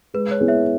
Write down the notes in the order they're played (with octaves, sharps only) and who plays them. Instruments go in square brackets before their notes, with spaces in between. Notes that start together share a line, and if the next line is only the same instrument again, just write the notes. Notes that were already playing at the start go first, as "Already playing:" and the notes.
[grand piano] G#3 [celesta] B4
[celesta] C#5
[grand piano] B3 E4 G#4
[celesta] C#5 E5